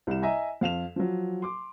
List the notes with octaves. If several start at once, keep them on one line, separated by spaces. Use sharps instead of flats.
C2 G3 E7
D#5 E5 G#5 A#5
F2 F5 E7 F7
F3 F#3
C6 D6